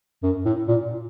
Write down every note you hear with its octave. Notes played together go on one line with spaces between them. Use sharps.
F#2
A2
A#2